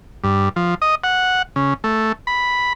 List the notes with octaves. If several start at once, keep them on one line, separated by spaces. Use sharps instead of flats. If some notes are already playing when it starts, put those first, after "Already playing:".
G2
F3
D#5
F#5
C#3
A3
B5